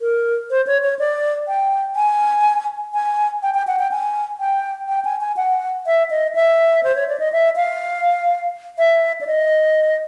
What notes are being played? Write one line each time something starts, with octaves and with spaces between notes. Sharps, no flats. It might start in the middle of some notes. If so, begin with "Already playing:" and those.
A#4
C5
C#5
C#5
D5
G5
G#5
G#5
G5
G5
F#5
G5
G#5
G5
G5
G#5
G#5
F#5
E5
D#5
E5
C5
C#5
D5
D#5
E5
F5
E5
D5
D#5